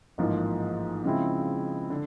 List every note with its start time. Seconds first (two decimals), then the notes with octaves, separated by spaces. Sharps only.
0.18 A1 G#2 F3 A#3
1.04 C#3 F3 G#3 C4 E4
1.90 D3